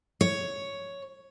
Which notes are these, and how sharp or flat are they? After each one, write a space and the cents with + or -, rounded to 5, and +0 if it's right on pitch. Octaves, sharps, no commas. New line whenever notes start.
C#5 +5